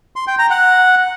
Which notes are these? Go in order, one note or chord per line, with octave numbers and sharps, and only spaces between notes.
C6
G5
A#5
F#5